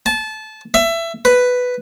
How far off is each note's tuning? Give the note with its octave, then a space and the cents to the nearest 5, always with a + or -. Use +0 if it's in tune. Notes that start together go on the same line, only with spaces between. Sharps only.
A5 -25
E5 +20
B4 +5